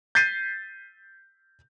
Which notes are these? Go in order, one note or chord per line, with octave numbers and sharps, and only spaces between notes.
G6 A6 B6 C7 D#7